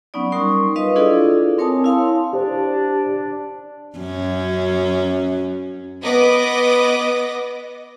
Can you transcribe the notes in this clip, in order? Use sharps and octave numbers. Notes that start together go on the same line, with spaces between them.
F#3 B3 C#4 D#4 D5
G3 D#4 A#4 C6 C#6 D#6
F4 B4 D#5 F5 D#6
D4 E4 F4 G#4 A4 D5
C4 A#4 C#5 G#5 A5 D#6
E4 F5 A5 C6
D4 G4 C5
F#2 C#4
B3 D#5 D6 D#6 A#6